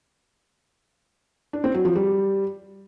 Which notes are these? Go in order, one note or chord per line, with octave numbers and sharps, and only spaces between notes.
D4
C4
F#3
F3
G3